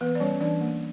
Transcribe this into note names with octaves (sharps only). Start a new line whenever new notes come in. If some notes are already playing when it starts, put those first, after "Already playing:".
E3 B3 B4
D5
G3 C#4 C#5
E3 D4 D5
A#3